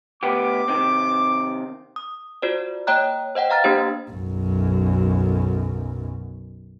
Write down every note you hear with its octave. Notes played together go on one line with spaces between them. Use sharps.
D2 B3 G4 D6
C3 D#3 C4
D#6
F4 F#4 C5 D5
A#3 C#5 D#5 G5 A#5 F#6
C5 D#5 F#5 G5
B4 D#5 F5 A#5 F6 A6
A#3 D4 G4 C5
B1 F#2